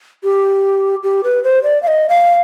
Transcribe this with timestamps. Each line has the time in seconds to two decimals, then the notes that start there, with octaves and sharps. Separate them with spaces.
0.24 G4
1.03 G4
1.24 B4
1.44 C5
1.63 D5
1.83 F5
1.87 D#5
2.09 F5